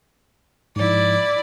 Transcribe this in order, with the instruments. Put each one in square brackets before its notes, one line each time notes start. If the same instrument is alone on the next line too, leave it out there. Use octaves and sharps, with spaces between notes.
[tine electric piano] G#2 F3 [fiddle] E4 D5